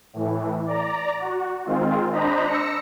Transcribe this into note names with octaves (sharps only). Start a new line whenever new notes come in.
A2 E3
D5 A#5
F#4
D#3 G#3 C4 F4
D4 C5 D#5 A#5 B5
E6 A#6 C#7